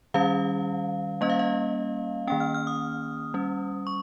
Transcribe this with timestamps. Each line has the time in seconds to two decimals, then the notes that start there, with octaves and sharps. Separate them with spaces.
0.14 D#3 G3 C#4 F5
1.21 G3 A#3 C#4 D#5
1.30 F5
1.39 D#5
2.27 D#3 A#3 C#4 G5
2.40 F6
2.54 F6
2.67 D#6
3.34 G3 C#4
3.87 C#6